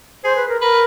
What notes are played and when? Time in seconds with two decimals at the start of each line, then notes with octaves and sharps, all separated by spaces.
0.24 G#4 C5
0.36 B4
0.49 A#4
0.61 A#4 B4